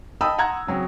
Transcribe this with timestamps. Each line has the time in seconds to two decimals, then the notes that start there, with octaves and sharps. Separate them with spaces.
0.21 D#5 G5 A5 B5 D#6 E6
0.38 F#5 A#5 C6 G#6
0.67 C#3 F#3 C4 C#4